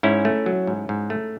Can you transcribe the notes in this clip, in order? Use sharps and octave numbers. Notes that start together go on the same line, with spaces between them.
G#2 C#4 E4
A3
F#3
G#2
G#2
A3